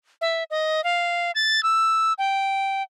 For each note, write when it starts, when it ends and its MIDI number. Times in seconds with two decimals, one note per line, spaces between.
0.21 0.44 76
0.51 0.83 75
0.84 1.31 77
1.35 1.63 93
1.63 2.13 88
2.18 2.83 79